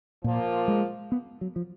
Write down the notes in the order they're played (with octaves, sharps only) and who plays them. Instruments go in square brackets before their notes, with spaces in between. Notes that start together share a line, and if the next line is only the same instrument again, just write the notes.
[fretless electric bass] A#2 [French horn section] F3 A#3 F4
[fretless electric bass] G#3
B3
F#3
F3